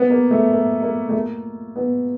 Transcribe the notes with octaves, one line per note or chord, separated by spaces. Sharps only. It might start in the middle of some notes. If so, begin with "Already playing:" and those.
Already playing: B3
A#3
A3
A#3
A#3
A3
A#3
B3